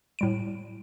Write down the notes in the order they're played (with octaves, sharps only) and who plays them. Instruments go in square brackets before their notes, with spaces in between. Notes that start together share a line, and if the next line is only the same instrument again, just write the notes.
[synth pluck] A2 G3 D7